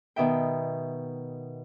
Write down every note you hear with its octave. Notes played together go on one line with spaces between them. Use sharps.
B2 D#3 E5 G5